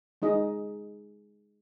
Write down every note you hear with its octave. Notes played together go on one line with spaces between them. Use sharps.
G#3 D#4 G#4 D#5